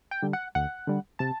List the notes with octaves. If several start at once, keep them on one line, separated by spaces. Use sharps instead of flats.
G5
D3 G3
F#5
D2 F#5
D3 G3
C3 A5